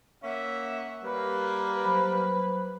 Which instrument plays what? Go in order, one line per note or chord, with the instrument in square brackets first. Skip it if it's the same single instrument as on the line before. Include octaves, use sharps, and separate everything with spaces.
[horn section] A#3 C#4 E5 [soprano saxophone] F#5
[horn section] G3 A#3 [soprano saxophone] B4
[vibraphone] F#3 C5 B5